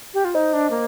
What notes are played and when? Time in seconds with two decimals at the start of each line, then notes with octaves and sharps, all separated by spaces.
0.14 G4
0.25 F4
0.34 D#4 C5 D#5
0.53 D4
0.70 A#3